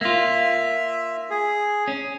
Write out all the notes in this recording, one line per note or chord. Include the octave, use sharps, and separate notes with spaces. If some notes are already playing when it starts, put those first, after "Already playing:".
A#3 F4 E5
G#4
C#4